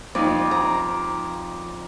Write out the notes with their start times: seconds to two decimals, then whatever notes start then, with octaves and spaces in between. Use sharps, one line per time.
0.15 F2 D#4 D5
0.51 A#5